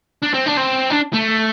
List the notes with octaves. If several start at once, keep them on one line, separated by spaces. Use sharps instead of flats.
D4
C4
D4
C4
D4
A3